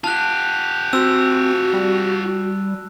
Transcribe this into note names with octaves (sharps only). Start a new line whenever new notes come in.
F4 G4 A5 F#6
C4 F#4 E6
G3